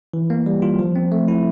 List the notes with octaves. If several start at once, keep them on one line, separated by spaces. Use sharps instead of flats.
E3
A#3
G3
F4
F3
C4
A3
E4